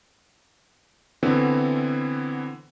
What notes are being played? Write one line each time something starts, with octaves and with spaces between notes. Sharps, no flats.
D3 E3 B3 C4